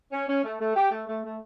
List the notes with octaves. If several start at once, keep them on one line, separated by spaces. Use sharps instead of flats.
C#4
C#4
A3
A3
G4
A3
A3
A3